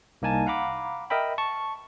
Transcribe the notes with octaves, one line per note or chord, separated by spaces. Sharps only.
C2 A#3 D#4 G#5 A5
F5 F#5 A#5 B5 D6
A#4 D#5 E5 G5 B5
A5 C#6